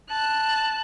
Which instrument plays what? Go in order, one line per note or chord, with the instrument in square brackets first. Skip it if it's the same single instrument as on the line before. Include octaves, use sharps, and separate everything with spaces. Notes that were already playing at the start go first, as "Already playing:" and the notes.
[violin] A5 F#6